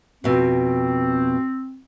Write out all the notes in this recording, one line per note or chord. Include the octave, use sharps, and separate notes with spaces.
F2 B2 C4